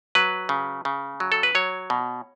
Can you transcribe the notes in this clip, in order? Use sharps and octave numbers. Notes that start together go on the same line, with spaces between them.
F#3 B4
C#3
C#3
F#3
A4
B4
F#3 C#5
B2